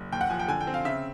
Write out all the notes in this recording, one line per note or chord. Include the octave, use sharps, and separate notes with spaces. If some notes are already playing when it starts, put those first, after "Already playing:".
Already playing: F#1
D#2 G5
F#5
F3 G#5
G5
D3 G#5
G5
C4
F5
C#3 E5